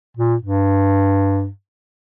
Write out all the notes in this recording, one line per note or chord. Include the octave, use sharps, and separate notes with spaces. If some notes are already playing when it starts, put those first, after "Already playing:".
A#2
G2